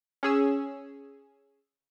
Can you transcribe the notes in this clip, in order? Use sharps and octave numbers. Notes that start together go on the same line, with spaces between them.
C#4 G#4 E6